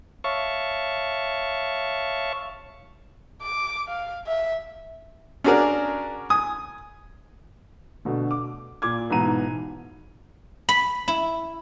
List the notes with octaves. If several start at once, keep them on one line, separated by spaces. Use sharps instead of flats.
C#5 E5 F5 A5 C#6
D6
F5
E5
C#4 D4 F#4 G#4 A#4 D5
G#5 D#6
B2 D3 A3
D6
A#2 D6 G#6
B1 G#2 E3 B3 A#5 D#7
B5
E4